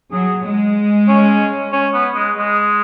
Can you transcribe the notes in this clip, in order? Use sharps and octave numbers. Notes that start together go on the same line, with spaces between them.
F#3 G#4
G#3
C#4
C#4
B3
G#3
G#3